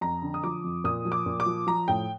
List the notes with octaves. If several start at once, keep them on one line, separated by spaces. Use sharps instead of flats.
F2 A#5
D3
D#6
F3 D6
F2
A#2 D#6
F3
D6
A#2
D6
F3
F3 A#5
A2 G5